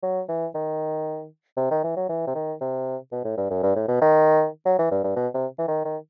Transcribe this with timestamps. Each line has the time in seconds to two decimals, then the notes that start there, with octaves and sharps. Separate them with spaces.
0.03 F#3
0.29 E3
0.55 D#3
1.57 C3
1.71 D#3
1.84 E3
1.97 F#3
2.09 E3
2.27 C3
2.35 D#3
2.61 C3
3.12 B2
3.25 A2
3.37 G2
3.50 F#2
3.63 G2
3.76 A2
3.88 B2
4.02 D#3
4.65 F#3
4.79 E3
4.91 G2
5.04 G2
5.16 B2
5.34 C3
5.59 E3
5.68 D#3
5.85 D#3